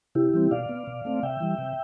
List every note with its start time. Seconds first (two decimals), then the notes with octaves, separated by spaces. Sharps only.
0.15 C3 E4 G4
0.33 E3 G3 C4
0.51 B2 D5 F5
0.69 B3
0.87 B2
1.05 A3 C4
1.23 C3 E5 G5
1.40 E3 G3
1.58 C3